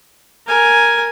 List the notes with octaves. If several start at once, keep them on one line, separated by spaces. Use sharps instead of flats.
A#4 G#5